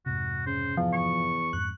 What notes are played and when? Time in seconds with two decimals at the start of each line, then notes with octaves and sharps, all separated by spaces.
0.06 F2 G#2 C3 F#4
0.46 C#3 C5
0.77 E2 F3
0.93 C#6
1.53 F2 G#2 F#6